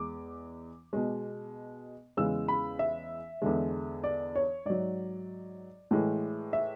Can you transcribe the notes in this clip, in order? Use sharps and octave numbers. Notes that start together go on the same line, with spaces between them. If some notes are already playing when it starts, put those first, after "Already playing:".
Already playing: E2 G#3 D6
B2 G#3
E2 C#3 E3 G#3 E6
B5
E5
E2 D3 G#3
D5
C#5
G#2 F#3 D5
A2 E3 G#3
E5